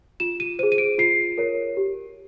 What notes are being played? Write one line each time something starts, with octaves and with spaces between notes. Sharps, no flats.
F4 E7
D#7
G#4 C5 D#7
D#7
D7
F4 C7
A#4 C#5
G4